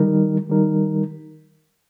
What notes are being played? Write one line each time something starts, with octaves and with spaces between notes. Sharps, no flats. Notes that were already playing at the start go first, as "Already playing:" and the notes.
Already playing: D#3 G3 D#4 A#4
D#3 G3 D#4 A#4